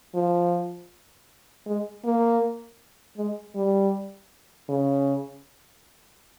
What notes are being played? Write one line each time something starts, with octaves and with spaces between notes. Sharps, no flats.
F3
G#3
A#3
G#3
G3
C#3